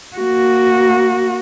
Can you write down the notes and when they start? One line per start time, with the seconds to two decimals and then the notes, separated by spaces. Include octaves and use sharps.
0.17 A#3 F#4